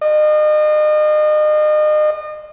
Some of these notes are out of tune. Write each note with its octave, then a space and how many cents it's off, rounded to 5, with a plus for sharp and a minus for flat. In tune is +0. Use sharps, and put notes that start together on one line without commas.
D#5 -35